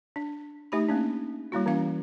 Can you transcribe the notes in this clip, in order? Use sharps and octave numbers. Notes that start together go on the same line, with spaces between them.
D4
A3 D#4 G4 G#5 B5
A#3 C#4 D4
G3 A#3 E4 F#4
E3 C#4 F5